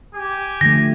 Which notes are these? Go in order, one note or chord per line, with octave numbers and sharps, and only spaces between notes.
G4 G#5
D3 F3 A3 A#6